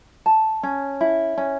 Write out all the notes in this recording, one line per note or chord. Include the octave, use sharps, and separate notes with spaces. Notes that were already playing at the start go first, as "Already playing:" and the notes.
A5
C#4
E4
C#4